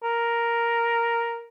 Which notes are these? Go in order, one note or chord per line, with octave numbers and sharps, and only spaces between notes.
A#4